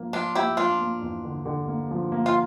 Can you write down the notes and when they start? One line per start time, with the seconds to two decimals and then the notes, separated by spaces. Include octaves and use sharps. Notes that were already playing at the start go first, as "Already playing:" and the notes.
Already playing: F3 A#3
0.13 F3 D4 F4
0.35 A#3 E4 G4
0.57 F3 D4 F4
0.80 A#3
1.02 E2
1.24 D3
1.46 D3
1.68 A#3
1.91 F3
2.12 A#3
2.26 F4